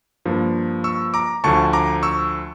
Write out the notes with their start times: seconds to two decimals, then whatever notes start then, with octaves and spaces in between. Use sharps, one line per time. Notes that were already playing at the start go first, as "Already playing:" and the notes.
0.25 G2 F3 A#3
0.84 C#6 E6
1.14 A#5 D6
1.44 D2 D3 F3 A5 C#6
1.73 A#5 D6
2.03 C#6 E6